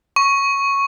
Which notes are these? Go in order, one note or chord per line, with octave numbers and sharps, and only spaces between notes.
C#6